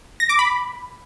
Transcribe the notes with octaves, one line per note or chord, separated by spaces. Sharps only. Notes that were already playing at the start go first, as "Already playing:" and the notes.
A#6
D6
B5